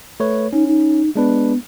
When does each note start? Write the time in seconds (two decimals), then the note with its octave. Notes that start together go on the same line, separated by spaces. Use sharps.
0.20 A3 B4 C#5
0.53 C#4 D#4
0.67 D#4
1.15 G#3 B3 D4 B4